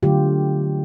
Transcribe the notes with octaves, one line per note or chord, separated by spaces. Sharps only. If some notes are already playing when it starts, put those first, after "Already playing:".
D3 F#3 A3 F4 G4